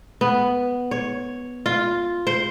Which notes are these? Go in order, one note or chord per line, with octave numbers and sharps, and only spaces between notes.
B3
C#5
F4
C5